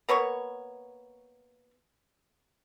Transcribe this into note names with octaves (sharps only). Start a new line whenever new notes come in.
A#3 B3 C#5 C#6